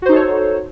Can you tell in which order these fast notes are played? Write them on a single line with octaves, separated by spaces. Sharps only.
F#4 C5 D#4 A4 C#5